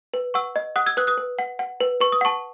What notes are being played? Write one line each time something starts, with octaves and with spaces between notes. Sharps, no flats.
B4
F#5 C#6 E6
D#5
F#5 D#6 F#6
E6 G#6
B4 D#6 F#6
D#6 F#6
B4
F#5
F#5
B4
B4 C#6
D#6
F#5 A5 C#6